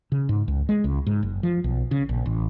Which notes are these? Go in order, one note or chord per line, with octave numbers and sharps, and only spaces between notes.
C#3
G#2
C#2
G#3
C#2
G#2
F#1
F3
B1
C#3
A#1
A1